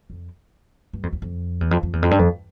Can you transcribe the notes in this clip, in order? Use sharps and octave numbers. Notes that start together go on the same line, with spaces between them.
F2
G2
F2
E2
F2
E2
F2
F2
E2
F2
G2
F2